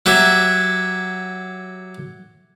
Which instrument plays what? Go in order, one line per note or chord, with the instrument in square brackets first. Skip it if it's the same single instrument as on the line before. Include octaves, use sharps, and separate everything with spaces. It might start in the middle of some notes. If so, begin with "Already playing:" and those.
[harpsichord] F#3 G4 E5 [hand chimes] F#6 G#6